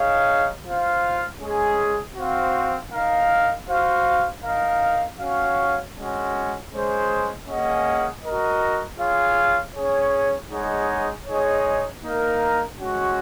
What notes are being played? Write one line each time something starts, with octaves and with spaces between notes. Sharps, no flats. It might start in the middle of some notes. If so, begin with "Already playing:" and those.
Already playing: D#4 G#4 C#5 F5
F4 C5 F5
G#3 C#4 G#4
C4 F#4 C5 F5
D#4 A#4 F5
F#4 C5 F5
D#4 A#4 F5
C#4 F#4 C#5 F5
G#3 C#4 F#4
G#3 C#4 G#4 C5
A#3 C#4 G#4 D#5 F#5
F#4 A#4 D#5
F4 G#4 C#5 F5
C#4 G#4 C#5
G#3 D#4 G#4 C#5 F#5
G#3 D#4 G#4 C#5
A#3 D#4 A#4 F5
G#3 C#4 F#4